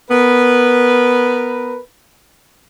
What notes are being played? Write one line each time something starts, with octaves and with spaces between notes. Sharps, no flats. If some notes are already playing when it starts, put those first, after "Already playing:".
B3 A#4 B4